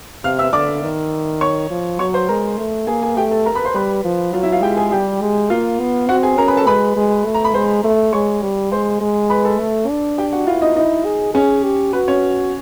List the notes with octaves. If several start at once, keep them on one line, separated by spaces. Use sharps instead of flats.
C3 F5 F6
E5 E6
D3 D5 D6
D#3
C#5 C#6
F3
F#3 C#5 C#6
C5 C6
G#3 A#4 A#5
A3
A#3 G#4 G#5
G#4 G#5
A3 G4 G5
A4 A5
A#4 A#5
B4 B5
C5 C6
G3 B4 B5
F3
F#3 F4 F5
E4 E5
F4 F5
G#3 G4 G5
G#4 G#5
G3 G4 G5
G#3
A#3 F4 F5
B3
C4 F#4 F#5
G#4 G#5
C#4 A#4 A#5
B4 B5
A4 A5
G#3 B4 B5
G#3
A3
A#5
B5
G#3 C5 C6
A3
G#3 C#5 C#6
G3
G#3 C5 C6
G#3
B4 B5
A4 A5
A3
D4
G4 G5
F#4 F#5
E4 F4 F5
D#4 D#5
D#4 E4 D#5
G#4
C#4 G#4 C#5
G4
F#4 B4
C#4 C#5